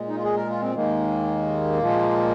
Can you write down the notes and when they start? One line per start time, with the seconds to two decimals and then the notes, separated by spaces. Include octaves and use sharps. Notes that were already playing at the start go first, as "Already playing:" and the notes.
Already playing: A#2 G#3
0.08 D#4
0.15 F4
0.23 G#4
0.36 A#4
0.49 F4
0.62 C4
0.75 D#2 D#3 G#3 A#3
1.79 A#2 F3 G#3